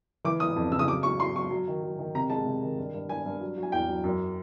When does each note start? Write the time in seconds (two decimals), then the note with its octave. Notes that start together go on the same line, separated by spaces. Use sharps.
0.25 E3 D6
0.40 E3 D#6
0.56 F2
0.72 C#3 E6
0.79 D#6
0.87 F#3 D6
1.03 F#3 C#6
1.20 F#3 C6
1.36 F#3 C#6
1.51 F#3
1.68 D#3
1.83 F#3
1.99 D#3
2.15 C3 A#5
2.30 G#3 A5
2.46 C3
2.63 D#3
2.78 G2
2.94 G2
3.09 G2 G#5
3.26 G2
3.41 F#3
3.58 F#3
3.63 G#5
3.72 E2 G5
3.89 F#3
4.04 F#2